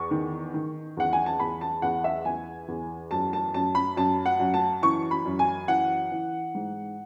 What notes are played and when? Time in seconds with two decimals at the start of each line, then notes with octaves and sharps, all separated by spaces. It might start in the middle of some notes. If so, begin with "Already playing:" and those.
Already playing: E2 C#6
0.11 D#3
0.54 D#3
0.97 E2 F#5
1.13 G#5
1.26 A5
1.40 E2 B5
1.61 A5
1.82 E2 F#5
2.04 E5
2.25 E2 G#5
2.68 E2
3.11 F#2 A5
3.33 A5
3.54 F#2 A5
3.75 B5
3.97 F#2 A5
4.26 F#5
4.40 F#2
4.54 A5
4.82 E3 C#6
5.11 B5
5.25 F#2
5.39 G#5
5.68 E3 F#5
6.11 E3
6.55 G#2